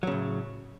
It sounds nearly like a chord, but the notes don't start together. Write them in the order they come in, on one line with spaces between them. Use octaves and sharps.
F#3 C#3 A2